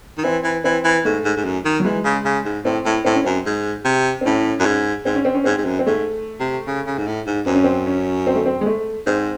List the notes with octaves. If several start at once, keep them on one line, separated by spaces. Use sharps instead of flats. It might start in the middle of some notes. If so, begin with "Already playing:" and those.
D#3
E3 C4
E3
E3 C4
E3
G#2 A3
G#2
G#2
F#2
D#3
F#3
E3 G#3
C#3
C#3
G#2
A2 C4
A2
A2 C4
C#4
F#2 C4
G#2
C3
C4
A2 C#4
F#2
G#2
G#2 C4
C#4
C4
C#4
G#2 C4
G#2
F#2
C4
G#2 A3
C3
C#3
C#3
G#2
A2
G#2
F#2 C4
C#4
C4
C#4
C4
A3
C4
G#3
A3
G#2 C4